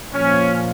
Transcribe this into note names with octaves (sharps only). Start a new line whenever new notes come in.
A#2 F3 C#4